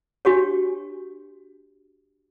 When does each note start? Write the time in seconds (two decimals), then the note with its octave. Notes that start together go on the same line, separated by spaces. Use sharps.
0.25 D4 F#4 G4 C#5